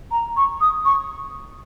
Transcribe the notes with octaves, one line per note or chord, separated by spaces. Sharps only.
A#5
C#6
D#6
C#6